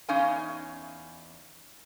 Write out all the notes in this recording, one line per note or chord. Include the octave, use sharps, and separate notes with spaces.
E2 C#4 D#4 F5 G#5